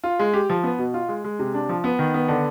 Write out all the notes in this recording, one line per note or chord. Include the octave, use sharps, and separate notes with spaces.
F4
G#3
G4
F3
B3
B2
F4
G#3
G#3
C3
D4
F3
B3
D#3
B3
D3